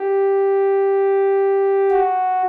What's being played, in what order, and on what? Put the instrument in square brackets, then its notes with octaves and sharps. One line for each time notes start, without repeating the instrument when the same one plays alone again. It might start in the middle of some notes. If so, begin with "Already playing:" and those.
Already playing: [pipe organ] G4
F#4